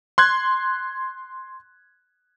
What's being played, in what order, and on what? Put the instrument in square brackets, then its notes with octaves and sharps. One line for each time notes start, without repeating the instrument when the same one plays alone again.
[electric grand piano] C6 F#6 G#6